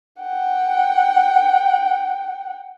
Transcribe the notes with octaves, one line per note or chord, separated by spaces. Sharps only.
F#5 G5